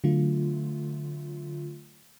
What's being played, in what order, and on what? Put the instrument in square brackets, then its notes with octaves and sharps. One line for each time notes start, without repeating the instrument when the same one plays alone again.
[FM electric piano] D3 F#3 A3 F4